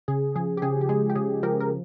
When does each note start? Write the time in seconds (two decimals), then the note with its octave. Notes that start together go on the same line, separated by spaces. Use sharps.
0.08 C#3 G#4
0.36 F3 G#4
0.57 G4
0.62 C#3 G#4
0.81 G4
0.89 G#3 G#4
1.10 G4
1.15 C#3 G#4
1.43 F3 G4 A#4
1.60 A#4